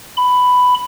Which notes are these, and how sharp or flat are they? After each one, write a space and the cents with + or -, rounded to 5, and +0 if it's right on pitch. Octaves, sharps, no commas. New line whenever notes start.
B5 +10